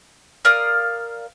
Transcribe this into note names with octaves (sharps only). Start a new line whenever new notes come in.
A#4 D5 F5 D#6